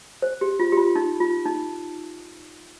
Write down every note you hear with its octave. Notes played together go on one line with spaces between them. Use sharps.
C5
G4
F4
G4
F4
D#4
F4
D#4